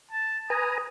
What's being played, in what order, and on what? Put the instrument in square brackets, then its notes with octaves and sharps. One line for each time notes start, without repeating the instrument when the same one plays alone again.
[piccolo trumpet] A5
[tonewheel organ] B4 G#5 A#5 [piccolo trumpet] D#6